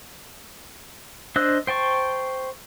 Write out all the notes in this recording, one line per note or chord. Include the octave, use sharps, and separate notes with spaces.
D4 C5 D#5 E6 F#6
C5 G5 A5 C#6